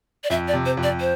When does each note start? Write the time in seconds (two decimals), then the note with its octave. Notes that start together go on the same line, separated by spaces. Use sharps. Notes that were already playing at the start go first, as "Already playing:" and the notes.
0.24 D5
0.30 F2 E5
0.48 D5
0.53 C3
0.66 C5
0.77 F2
0.83 D5
1.01 C5